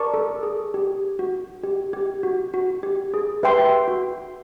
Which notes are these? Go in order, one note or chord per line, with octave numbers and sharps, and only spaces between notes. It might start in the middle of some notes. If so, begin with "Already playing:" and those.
Already playing: A#4 D5 A5 C#6
A4
G#4
G4
F#4
G4
G4
F#4
F#4
G4
G#4
G4 B4 E5 G5 C6
F#4